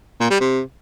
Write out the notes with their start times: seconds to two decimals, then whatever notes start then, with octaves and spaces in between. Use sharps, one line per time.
0.20 A#2
0.30 G3
0.41 C3